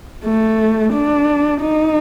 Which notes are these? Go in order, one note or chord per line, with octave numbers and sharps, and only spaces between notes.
A3
D4
D#4